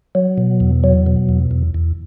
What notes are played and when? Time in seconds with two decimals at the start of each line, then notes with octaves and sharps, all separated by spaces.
0.15 F#3
0.38 B2
0.60 E2
0.84 F#3
1.06 B2
1.29 E2
1.51 E2
1.74 E2